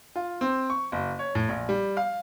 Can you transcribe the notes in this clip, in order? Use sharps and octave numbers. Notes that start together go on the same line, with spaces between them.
F4
C4
C#6
F#1
C#5
A2
A#1
G3
F5